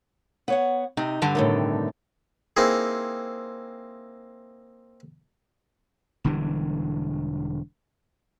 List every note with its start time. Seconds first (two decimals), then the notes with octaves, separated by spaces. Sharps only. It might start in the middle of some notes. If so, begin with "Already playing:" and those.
0.48 B3 C#5 F#5
0.97 C3 D#4
1.22 G2 D3 G3
1.35 A2 C3 D#3
2.56 A#3 C4 D#4 E4 G#4
6.24 E1 D3 E3 G3